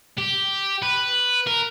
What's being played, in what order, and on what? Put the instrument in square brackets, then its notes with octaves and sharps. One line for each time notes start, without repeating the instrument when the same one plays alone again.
[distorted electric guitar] G4
B4
A#4